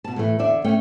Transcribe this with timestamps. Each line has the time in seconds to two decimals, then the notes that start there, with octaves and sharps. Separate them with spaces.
0.04 B2 A5
0.16 A2 E3 A3
0.39 E2 D3 D5 E5
0.64 A3 C#4 G5